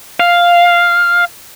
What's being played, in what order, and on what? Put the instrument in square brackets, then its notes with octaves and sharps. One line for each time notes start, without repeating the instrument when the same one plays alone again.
[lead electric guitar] F5